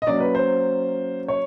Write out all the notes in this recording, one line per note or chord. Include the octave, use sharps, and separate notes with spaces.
D#5
F#3 A#3 C#4 D5
B4
C5
C#5